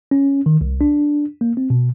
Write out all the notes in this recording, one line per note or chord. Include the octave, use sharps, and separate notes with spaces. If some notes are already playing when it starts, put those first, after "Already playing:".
C#4
D#3
C2
D4
A#3
C4
B2